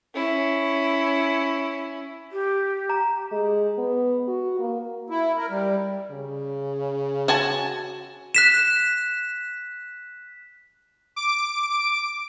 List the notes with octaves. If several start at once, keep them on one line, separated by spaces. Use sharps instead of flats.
C#4 E4
G4
A#5
G#3
B3
F#4
A#3
E4
A#4
G3
C#3
F#4 G#5 A5
F#6 B6 E7
D6 D7